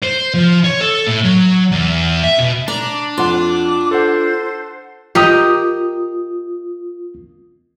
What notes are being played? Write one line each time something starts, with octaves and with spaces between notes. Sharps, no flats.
C5
F3
C#5
A4
A2
F#3
E2
E5
B2
D4 A#5 D6
F2 F4 F#5 D6
A4 C5 F#5
F4 G4 A#4 D#5 D#6